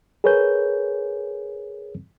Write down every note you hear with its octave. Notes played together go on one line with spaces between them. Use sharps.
G#4 A#4 B4 C#5 G#5 G6